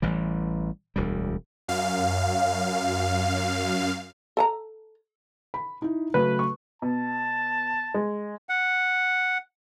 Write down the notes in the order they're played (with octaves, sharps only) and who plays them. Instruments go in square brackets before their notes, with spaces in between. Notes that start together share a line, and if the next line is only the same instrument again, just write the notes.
[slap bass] A1 E3 G3
E1 D2 G3
[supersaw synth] F#2 F5
[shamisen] A4 A5 A#5
[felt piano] B5
D#4 E4
[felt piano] C#3 F#3 A3 [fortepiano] B4
[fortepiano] C#6
[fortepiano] B2 [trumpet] A5
[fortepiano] G#3
[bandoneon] F#5